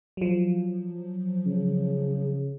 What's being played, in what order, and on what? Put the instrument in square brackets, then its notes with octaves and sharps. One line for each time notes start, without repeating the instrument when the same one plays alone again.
[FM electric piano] F3 F#3
[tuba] C#3